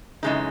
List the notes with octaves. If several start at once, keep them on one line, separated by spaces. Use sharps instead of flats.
F#2 C#3 E3 G#3 D#4